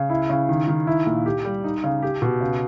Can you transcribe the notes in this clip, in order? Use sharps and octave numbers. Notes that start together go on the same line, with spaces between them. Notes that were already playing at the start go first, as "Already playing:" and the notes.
Already playing: C#3
E4
C#3
D#3
D#3
E4
A#2
G4
G3
D#4
C#3
G4
B2
C#3